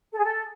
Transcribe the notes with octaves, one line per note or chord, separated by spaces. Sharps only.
A4
G#4
A4